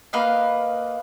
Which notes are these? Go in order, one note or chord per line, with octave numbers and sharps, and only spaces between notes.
A#3 B4 D#5 F5